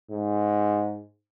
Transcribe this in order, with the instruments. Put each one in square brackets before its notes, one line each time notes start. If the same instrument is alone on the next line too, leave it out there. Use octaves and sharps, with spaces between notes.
[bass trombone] G#2